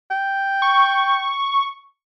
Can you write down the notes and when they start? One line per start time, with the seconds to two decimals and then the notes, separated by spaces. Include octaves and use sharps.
0.11 G5
0.62 C#6